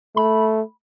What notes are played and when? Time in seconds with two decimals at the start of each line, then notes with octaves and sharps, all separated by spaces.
0.16 A3 B5